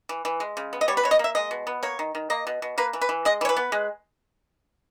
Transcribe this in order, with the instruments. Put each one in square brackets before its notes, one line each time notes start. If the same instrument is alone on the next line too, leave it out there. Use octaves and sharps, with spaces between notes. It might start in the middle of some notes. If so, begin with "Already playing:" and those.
[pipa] E3
E3
G#3
C#3
B3
D#5
G3 C#5
B4
B2 C#5
D#5
A#3 E5
G#3 D#5
B2
B3
A#3 C#5
D#3
D#3
A#3 D#5
B2
B2
A#3 B4
E3
B4
E3
G#3 D#5
E3 C#5
B4
B3
G#3